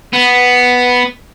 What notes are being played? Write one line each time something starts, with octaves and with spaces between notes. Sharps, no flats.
B3